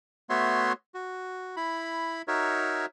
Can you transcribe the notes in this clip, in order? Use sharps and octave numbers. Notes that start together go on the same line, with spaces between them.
A3 B3 F#4 C#5 E5 C6
F#4
E4 B5
D#4 F#4 A#4 C#5 E5